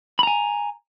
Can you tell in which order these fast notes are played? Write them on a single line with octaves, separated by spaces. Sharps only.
B5 A#5 G#5